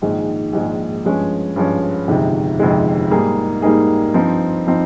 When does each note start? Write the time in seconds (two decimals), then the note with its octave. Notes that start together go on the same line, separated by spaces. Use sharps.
0.02 A#1 G#2 D#3 G#3
0.53 A#1 G#2 D#3 G#3
1.05 G2 F3 G#3 C#4
1.56 G2 F3 G#3 C#4
2.08 G1 F2 C3 D#3 G#3
2.59 G1 F2 C3 D#3 G#3
3.11 G#2 G3 A#3 D#4 G#4
3.62 G#2 G3 A#3 D#4 G#4
4.14 G2 F3 C4 D#4
4.67 F3 C4 D#4